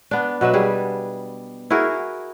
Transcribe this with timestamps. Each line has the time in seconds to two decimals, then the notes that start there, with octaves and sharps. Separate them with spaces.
0.11 B3 D4
0.41 B2 F#3 B4 E5
0.54 G3 G#4
1.70 E4 F#4 G#4 A#4